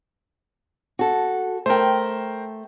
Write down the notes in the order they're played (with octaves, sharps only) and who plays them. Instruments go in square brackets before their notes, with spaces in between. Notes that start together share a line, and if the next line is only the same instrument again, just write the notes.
[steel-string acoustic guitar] F#4 A4
[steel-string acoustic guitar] A3 G5 [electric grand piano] A#4 C5